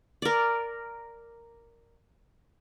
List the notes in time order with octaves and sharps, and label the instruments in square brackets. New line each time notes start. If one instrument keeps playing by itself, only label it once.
[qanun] A#4 D5